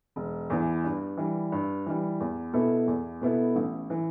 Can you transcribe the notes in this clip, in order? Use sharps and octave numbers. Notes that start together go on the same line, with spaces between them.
E1
E2 E3
G2
E3 G3
G2
E3 G3
E2
B2 B3 E4 A4
E2
B2 B3 E4 A4
A1
E3